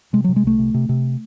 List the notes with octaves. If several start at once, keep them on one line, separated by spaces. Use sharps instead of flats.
C3 G#3
C3 F#3
G#3
C2 A3
C3
C3
C3